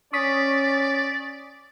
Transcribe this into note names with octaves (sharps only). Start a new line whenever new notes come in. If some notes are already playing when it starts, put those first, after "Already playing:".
C#4 D5 C#6 D#6 B6